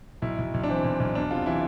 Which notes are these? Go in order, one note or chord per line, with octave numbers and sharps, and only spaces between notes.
B1 E4
B1
B1
D4
E3 C4
B1
B1
E2 D4
C3 F4
E3 E4